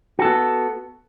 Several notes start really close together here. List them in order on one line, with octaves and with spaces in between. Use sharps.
F#4 A4 B3